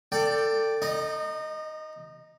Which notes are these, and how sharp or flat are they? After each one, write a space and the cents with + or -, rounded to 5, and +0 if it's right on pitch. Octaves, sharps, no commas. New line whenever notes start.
A4 +25 D5 +0 G5 +0
D#4 +0 D#5 -35